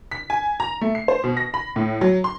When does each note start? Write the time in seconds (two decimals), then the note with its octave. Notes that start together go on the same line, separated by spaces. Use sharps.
0.11 B6
0.30 G#5
0.60 A#5
0.81 A3
0.95 C7
1.08 C5
1.24 B2
1.37 A#6
1.54 B5
1.76 A2
2.01 F#3
2.24 C6